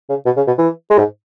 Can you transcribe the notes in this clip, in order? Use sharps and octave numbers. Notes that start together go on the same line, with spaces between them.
C#3
B2
C#3
B2
E3
G#3
G#2